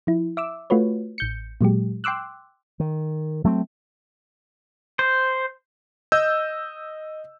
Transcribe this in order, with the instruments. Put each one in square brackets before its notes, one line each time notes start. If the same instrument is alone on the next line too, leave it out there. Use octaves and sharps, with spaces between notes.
[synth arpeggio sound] F3 E4
E5 D6 E6
A3 F4 F#4 B4 C#5
A1 G6 C#7
A#2 F#3 G#3 G4
G5 C6 D6 E6 F#6
[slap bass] D#3
F#3 A3 A#3 C4
[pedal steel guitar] C5
[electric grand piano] D#5 E6 G6